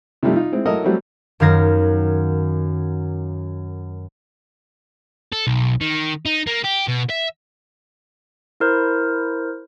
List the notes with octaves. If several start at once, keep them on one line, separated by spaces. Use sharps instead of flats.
C3 F3 G3 A3 D#4
D#4 F4
G#3 C4 E4
F#3 E4 F#4 A4 A#4 D#5
F#3 G3 A3 C4 F#4
F#2 D#3 F5 G#6 A#6
A4
B1
D#3
D#4
A#3
G4
B2
E5
E4 A#4 C5